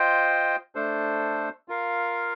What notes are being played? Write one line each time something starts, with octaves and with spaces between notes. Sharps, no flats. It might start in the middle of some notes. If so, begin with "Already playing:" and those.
Already playing: F4 C5 D#5 G5
A3 D4 A4 C5
F4 A#4 F5